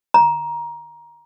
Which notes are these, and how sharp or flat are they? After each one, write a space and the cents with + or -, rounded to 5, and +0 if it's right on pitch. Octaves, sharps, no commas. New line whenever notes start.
A#5 +15